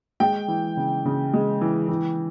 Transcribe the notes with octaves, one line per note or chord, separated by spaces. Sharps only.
G#3 G5
E3
C#3
C#3
G#3
E3
E3